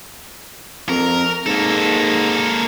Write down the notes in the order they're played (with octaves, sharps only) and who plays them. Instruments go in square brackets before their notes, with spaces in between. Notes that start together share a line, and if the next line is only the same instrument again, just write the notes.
[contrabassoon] F2 [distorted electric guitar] A#4
[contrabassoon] G#2 [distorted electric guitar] A#3 A4